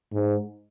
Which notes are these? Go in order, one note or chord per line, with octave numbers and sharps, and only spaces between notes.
G#2